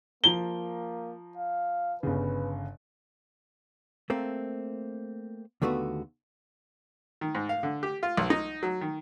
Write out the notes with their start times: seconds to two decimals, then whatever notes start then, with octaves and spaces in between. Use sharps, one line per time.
0.24 F3 A#3 A#5 G7
1.38 F5
2.03 G1 C#3 B4
4.10 A3 A#3 C4
5.62 D#2 D3 A3 B3 F#4
7.21 D#3
7.35 G#2
7.49 F5
7.63 D3
7.83 G4
8.03 F4
8.17 B1
8.30 D#4
8.63 F#3
8.81 D#3